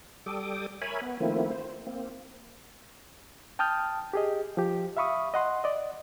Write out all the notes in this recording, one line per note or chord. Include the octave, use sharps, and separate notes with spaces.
G3 A4 G5 D6 D#6
A#4 C#5 E5 G#5 B5
B3
D#3 F3 A3 A#3 C4 E4
C5
A#3 C4
G5 A5 D#6 F6 G6
G4 G#4 D#5
F3 G4
E5 F5 B5 C#6 D#6
D#5 F#5 C6
D5 D#5